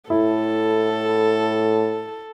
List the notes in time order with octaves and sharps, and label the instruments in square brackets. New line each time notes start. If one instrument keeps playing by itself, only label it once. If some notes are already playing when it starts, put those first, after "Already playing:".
[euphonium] A2 [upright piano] E4 [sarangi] A4